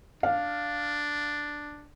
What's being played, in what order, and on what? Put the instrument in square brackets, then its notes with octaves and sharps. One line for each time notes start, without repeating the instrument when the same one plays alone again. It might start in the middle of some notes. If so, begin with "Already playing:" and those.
[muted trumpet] D4 [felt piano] F5